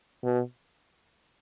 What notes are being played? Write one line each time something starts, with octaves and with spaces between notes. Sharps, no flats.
B2